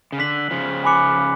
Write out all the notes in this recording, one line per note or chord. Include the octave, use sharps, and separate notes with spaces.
C#3
D3 F#6 B6 F#7
C#3 F3
G#5 B5 D6 F#6 C#7